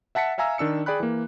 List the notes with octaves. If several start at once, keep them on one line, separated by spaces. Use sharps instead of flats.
E5 F#5 A5 B6 C#7
E5 F5 G#5 A#5 E6
D#3 D4 E6 C#7
G#4 D5 G5 B5 F#6
E3 A#3